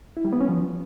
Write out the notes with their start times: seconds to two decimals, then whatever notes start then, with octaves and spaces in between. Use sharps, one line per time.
0.17 E4
0.25 G3
0.33 B3
0.41 C#4
0.48 F3